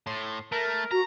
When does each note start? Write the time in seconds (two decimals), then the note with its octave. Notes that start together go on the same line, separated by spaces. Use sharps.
0.07 A2 C6
0.52 A3 A#4
0.91 F#4 A#5